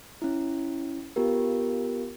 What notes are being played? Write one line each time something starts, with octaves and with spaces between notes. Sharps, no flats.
C#4 E4
B3 F4 G4 A#4